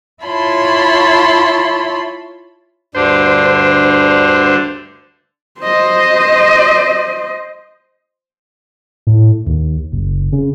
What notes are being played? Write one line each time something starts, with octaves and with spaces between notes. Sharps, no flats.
E4 F4 C#5 A5 B5 C6
D2 G2 D3 D4 C5
C5 D#5
A2
D#2
F#1
C#3